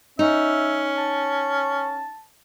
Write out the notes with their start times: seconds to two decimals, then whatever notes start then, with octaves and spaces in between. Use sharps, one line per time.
0.19 C#4 D#4 E5
0.98 A5